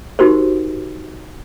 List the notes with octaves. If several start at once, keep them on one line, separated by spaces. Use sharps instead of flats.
D#4 F#4 G4 A#4 C5